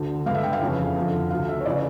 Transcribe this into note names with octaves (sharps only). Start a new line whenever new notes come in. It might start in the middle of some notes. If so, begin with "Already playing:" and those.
Already playing: D2 D3
G2 D3 F5
E5
G5
F5
F2 C#3 E3
F2 D3
D2 D3 F5
E5
C#5
C#3 E3 D5